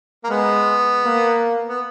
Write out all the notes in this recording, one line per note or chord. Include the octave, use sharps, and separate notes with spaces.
A#3
G#3 B3
A#3
B3